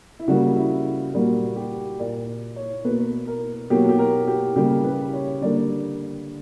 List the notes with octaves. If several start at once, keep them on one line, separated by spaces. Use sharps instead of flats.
E4
C#3 G3 A#3 F#4
E4
A#2 G3 A#3 F#4
G4
A#2 A#3 D5
C#5
B2 A#3 B4
A#4
B2 F#3 A#3 G4
G4
A#4
G4
C#3 G3 A#3 G4
B4
C#5
D3 G3 A#3 D5